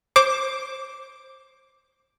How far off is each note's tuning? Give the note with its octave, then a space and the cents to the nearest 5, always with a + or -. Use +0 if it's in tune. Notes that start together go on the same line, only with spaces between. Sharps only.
C5 +20 D6 -5